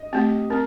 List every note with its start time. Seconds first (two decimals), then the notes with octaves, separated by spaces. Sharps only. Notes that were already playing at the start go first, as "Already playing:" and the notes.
Already playing: D#5
0.12 A3 C4 G4
0.50 C4 A#4